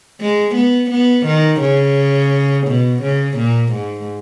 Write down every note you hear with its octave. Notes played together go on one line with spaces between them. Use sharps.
G#3
B3
B3
D#3
C#3
B2
C#3
A#2
G#2